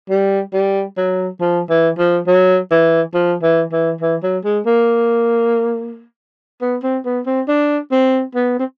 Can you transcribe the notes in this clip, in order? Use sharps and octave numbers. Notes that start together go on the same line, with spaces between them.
G3
G3
F#3
F3
E3
F3
F#3
E3
F3
E3
E3
E3
F#3
G#3
A#3
B3
C4
B3
C4
D4
C4
B3
C4